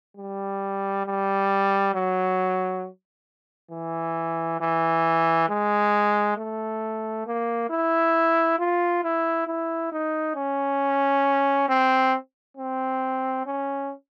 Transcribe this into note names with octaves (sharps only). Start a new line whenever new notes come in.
G3
G3
F#3
E3
E3
G#3
A3
A#3
E4
F4
E4
E4
D#4
C#4
C4
C4
C#4